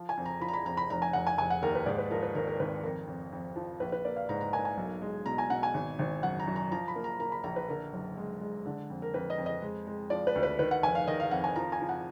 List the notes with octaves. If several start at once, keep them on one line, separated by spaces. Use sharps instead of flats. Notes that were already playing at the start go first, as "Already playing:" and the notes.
Already playing: F3
G#5
F2
A#5
F3 B5
A#5
B5
F2 A#5
B5
F1 A#5
G#5
F1 F#5
G#5
F1 G#5
F#5
D#2 A#4
B4
G#2 D5
B4
F3 A#4
B4
G#1 A#4
A#4
G#1 B4
F2 A#4
F2
F2
F3
A#1 B4
B4
A#3 D5
F5
G#2 A#5
A#5
A#3 G#5
G#5
B1
G#3
B2 A#5
G#5
B2 F#5
G#5
G#1
G#1
F#2 F#5
A#5
F#2
A#5
F3 A#5
B5
A#3
A#5
A#3 A#5
B5
A#1 A#5
B4
D3 A#4
F#1
G#3
G#3
D3
F2
A#4
F2 B4
D#5
F2
D#5
G#3
G#3
F3 D5
B4
D2
B4
D#3 B4
F#5
F1 G#5
F5
D#3 D#5
F5
F2 F#5
G#5
F3 A#5
G#5
F3
F#5